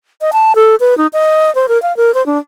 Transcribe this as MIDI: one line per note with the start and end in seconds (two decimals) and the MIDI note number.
0.21 0.31 75
0.33 0.55 81
0.55 0.75 69
0.80 0.97 71
0.98 1.07 63
1.13 1.53 75
1.55 1.66 72
1.68 1.80 70
1.83 1.95 77
1.97 2.14 70
2.14 2.25 72
2.26 2.38 62